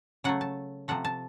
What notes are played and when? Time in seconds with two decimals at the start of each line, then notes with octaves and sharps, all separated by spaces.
0.24 C#3 F#3 A3 F#5
0.41 A5
0.88 C3 F3 A3 F#5
1.05 A5